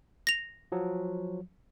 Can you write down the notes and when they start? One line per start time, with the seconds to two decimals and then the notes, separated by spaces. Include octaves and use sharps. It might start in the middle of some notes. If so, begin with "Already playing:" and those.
0.27 A#6 F7
0.72 F3 F#3